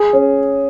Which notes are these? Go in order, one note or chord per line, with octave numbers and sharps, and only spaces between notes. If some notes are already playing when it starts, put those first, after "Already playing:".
Already playing: G#4
C#4